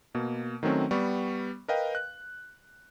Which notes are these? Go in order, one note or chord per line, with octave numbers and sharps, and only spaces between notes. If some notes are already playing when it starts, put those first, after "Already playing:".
B2 A#3
D#3 F#3 A3 C4 C#4
G3 B3 C#6
A#4 B4 D#5 F5 G5
F#6